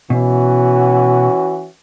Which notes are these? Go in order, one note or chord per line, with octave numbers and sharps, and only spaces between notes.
B2 E3 C#4 F#4